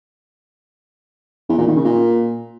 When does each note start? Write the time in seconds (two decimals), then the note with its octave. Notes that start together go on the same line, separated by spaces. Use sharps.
1.49 E2
1.58 A#2
1.67 D#3
1.76 C#3
1.85 A#2